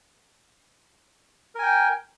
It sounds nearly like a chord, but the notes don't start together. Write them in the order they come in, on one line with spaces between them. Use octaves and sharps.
A#4 G#5 G5